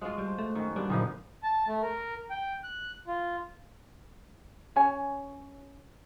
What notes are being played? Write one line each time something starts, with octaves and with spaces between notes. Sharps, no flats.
F3 G#3 F4 F#4
G3 C5 A5
A3 A5
F#2 D#3 F#4 G#5
A#2 D3 G3 B3 D4
F#1 A#2 D3 F3 G3 D#4 G#4
A5
A3
A#4
G5
F#6
F4
C#4 C#5 G#5